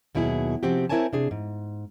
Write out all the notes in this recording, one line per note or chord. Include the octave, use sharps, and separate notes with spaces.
D#2 B2 F#3 E4 G#4
C3 F3 C4 F#4 G4
C4 E4 A#4 C#5 G#5 A5
C3 D4 G#4
G#2